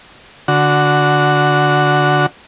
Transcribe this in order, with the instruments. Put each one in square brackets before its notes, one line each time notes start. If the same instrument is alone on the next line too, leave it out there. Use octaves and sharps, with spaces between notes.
[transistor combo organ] D3 F#4